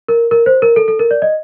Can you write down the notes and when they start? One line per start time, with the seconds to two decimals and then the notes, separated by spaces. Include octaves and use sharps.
0.08 A#4
0.31 A#4
0.46 C5
0.62 A#4
0.76 A4
0.88 A4
0.99 A#4
1.11 D5
1.22 D#5